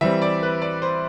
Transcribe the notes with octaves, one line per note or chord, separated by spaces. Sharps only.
E3 G3 C4 E5
D5
B4
D5
C5